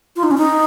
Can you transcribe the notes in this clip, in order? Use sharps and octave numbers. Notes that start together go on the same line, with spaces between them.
F4
D#4
C#4
D#4